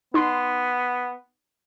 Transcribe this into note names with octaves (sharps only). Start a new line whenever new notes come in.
B3 D#4 C6